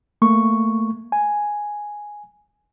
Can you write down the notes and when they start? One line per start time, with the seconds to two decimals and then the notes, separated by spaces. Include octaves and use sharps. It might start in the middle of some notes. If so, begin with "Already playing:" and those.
0.22 A3 A#3 C#6
1.12 G#5